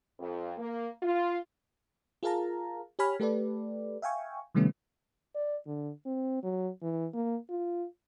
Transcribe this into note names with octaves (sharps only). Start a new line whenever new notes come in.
F2
A#3
F4
F4 G#4 A#4 F5 A5 A#5
G4 C#5 G#5 B5 F6
A3 G4 A4 B4 D5
E5 F5 G5 G#5 C#6
C3 D#3 G3 A3 B3 C#4
D5
D3
C4
F#3
E3
A#3
F4